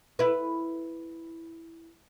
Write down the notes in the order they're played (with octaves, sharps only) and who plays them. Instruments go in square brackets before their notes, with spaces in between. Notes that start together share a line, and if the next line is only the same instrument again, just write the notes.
[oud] E4 B4